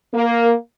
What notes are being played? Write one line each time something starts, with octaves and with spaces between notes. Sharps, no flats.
A#3